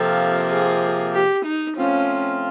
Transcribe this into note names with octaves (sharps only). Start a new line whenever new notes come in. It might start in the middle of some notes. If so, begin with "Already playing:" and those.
Already playing: C3 F3 A#3 A4
G#4
G4
D#4
F3 A3 C4 C#4 F4